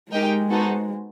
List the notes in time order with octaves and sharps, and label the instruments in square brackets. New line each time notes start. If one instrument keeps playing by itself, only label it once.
[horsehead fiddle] G#3 [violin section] D#4 G4 A#4 D#5 G5
[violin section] B3 D#4 F#4 A4 C5